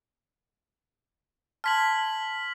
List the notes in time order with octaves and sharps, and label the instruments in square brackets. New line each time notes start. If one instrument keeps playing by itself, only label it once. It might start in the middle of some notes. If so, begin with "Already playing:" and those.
[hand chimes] A5 C6 G#6 [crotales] F6 B6 F#7